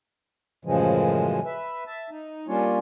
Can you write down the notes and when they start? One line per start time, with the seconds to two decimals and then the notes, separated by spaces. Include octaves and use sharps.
0.65 F#2 A2 C#3 E3 F3 G#3
1.45 B4 E5
1.87 E5 A5
2.10 D#4
2.48 G3 A#3 C#4 D4 F4 C#5